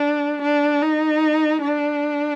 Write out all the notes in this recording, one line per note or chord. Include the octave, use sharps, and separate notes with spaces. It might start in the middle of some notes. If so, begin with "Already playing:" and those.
Already playing: D4
D4
D#4
D4